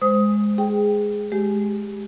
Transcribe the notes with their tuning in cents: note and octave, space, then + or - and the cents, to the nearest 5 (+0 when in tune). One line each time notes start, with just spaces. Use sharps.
G#3 +0 C5 -20 D#6 +15
G#4 +0 G5 +0
G#3 +20 G4 +0